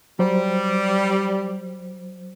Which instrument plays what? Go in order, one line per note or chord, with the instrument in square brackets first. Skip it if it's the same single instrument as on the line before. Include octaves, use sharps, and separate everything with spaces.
[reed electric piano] F#3 C5 [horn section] G3